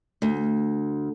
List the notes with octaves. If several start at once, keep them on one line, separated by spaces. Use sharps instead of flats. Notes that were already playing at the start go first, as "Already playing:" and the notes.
D2